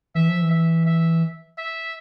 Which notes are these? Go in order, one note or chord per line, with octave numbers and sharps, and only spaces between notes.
E3 E5
F3
E3
E5
E5
E5